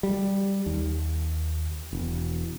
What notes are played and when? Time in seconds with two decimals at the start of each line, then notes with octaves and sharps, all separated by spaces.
0.03 G3
0.66 D#2
1.93 E1